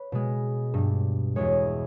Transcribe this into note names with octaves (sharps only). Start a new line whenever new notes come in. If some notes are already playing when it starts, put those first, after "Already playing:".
Already playing: B4 C#5
B2 G#3
G2 G3
E2 B2 G#3 C#5